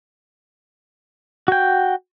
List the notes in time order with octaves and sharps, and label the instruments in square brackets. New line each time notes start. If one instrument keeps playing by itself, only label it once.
[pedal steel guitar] F#4 G5